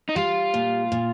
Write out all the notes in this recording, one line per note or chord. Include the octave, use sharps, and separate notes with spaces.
D#4
G3 F4
A#2
A#2